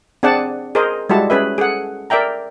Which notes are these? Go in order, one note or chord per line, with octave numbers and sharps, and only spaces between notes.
C4 D4 G#4 D5 F#5 A5
G#4 A#4 C5 D#5
G3 G#3 E4 F#4 A5
C#4 G#4 B4 E5
G#4 A4 F#5
A#4 D5 E5 G5 A#5